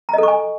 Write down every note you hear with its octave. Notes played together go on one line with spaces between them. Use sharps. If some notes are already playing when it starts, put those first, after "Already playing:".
A4 D#5 G#5 A#5 C#6